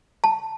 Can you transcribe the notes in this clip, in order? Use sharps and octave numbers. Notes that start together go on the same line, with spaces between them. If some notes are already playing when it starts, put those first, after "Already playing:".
A5